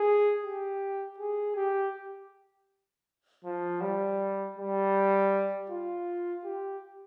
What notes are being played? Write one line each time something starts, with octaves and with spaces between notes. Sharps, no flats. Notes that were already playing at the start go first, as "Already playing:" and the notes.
Already playing: G#4
G4
G#4
G4
F3
G3
G3
F4
G4